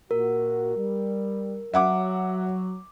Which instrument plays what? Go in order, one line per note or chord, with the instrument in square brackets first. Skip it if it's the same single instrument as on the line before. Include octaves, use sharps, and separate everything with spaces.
[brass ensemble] A#2 F#4 [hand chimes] A#4
[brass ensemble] G3
[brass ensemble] F#3 [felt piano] E5 F#5 D6